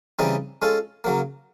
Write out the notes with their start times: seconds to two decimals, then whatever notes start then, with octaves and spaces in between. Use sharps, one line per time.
0.19 C#3 E3 G3 C4 D#4
0.62 G#3 C#4 F4 A4
1.04 C#3 F#3 A#3